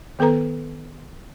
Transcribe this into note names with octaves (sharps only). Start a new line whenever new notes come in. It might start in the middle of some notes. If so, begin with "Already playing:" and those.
D#3 B3 A4 B4 A#5